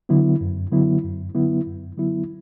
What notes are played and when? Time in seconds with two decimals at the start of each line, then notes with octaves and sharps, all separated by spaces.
0.09 D3 F#3 B3 E4
0.41 F#2
0.72 D3 F#3 B3 E4
1.03 F#2
1.35 D3 F#3 B3 E4
1.66 F#2
1.97 D3 F#3 B3 E4